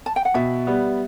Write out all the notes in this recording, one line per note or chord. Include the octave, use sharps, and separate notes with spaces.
A5
G5
F#5
B2 E5
G3 B3